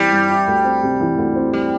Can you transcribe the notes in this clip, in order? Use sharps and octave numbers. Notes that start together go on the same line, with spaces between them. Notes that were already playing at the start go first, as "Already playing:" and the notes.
Already playing: G2 E3 G3 C4 E4
G2
E4
D2
C4
C3
E3
D2
C4
G3